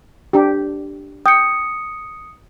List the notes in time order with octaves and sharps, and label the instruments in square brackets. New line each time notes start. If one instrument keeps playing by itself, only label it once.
[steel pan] D4 G4
[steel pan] G5 [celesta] D#6 C#7